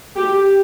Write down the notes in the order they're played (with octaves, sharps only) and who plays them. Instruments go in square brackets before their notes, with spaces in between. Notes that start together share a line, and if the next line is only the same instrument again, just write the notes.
[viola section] G4